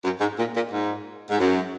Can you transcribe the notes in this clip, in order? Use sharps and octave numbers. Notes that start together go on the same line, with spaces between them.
F#2
G#2
A#2
A#2
G#2
G#2
F#2